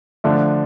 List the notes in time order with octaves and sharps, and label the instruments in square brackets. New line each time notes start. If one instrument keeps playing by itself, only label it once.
[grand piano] D3 F3 A3 D4 F4